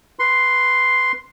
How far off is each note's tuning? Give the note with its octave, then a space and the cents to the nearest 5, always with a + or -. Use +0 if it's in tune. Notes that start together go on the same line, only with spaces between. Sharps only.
B4 +0 C6 +0